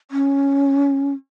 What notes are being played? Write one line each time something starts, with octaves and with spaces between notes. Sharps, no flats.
C#4